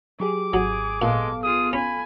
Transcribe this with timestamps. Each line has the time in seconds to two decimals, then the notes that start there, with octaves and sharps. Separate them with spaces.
0.20 F#3 G4 G#4 D6
0.53 G#1 F#3 G#4
1.02 A#2 G#3 B3 A4 F5
1.44 F4 G#4 D#6
1.73 C#4 G#5 B5